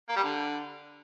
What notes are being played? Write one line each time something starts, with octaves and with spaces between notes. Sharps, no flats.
A#3
G3
D3